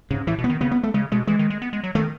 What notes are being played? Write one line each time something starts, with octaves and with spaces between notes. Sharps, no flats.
G#2 C#3
A2 E3
B2
B3
D#3
C#3 B3
B3
A3
C#3 G#3
B2 G#3
E3 G#3
D#3
G#3
B3
G#3
F#3
D#3 A3